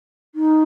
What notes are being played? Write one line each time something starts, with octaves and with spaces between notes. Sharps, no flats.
D#4